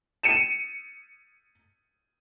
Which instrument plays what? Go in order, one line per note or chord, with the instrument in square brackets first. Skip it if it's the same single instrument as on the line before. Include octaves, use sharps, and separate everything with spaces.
[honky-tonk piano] C#7 D#7 E7